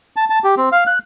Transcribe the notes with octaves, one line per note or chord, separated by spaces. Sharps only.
A5
A5
G4
C4
F5
F#6